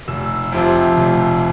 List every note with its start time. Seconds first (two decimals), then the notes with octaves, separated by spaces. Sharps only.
0.08 F1 E6
0.52 F2 C3 F3
0.97 F1